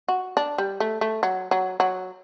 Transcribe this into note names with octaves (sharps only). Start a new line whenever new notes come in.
F#4
D4
G3
A3
A3
F#3
F#3
F#3